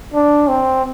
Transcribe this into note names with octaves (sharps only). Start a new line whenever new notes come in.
D4
C4